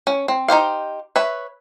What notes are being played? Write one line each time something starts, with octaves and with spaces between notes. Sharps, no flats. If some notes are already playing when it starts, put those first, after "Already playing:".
C#4
C4
D#4 G4 C5 F5
B4 C#5 E5